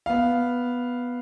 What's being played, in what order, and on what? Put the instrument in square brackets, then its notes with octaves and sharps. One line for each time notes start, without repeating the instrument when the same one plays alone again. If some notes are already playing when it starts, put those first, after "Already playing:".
[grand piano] B3 F5